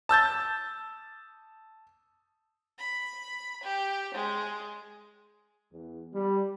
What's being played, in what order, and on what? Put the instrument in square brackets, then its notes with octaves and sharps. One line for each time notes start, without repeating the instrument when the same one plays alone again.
[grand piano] A5 E6 G6 A6
[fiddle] B5
G4
G#3
[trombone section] E2
G3